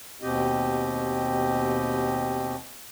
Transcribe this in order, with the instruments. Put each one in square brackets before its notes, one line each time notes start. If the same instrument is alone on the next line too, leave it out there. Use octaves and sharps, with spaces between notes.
[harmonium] D#2 B2 C4 G4 D#5